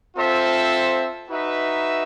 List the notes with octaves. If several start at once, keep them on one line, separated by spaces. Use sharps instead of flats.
C4 F4 A4 C5 E5
D#4 F#4 B4 E5